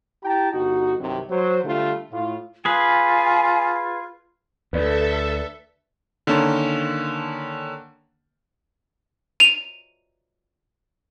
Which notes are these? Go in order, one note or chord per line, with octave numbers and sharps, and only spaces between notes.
E4 G4 G5 A5 A#5
G1 D#4 F#4
C2 G2 C3 D#3 F#3
F#3 C5
D3 G3 A3 F4
A2 F4
F4 G#4 B4 G#5
D2 A4 B4 D5 E5
D3 D#3 A#3 C#4 A5
D#7 F7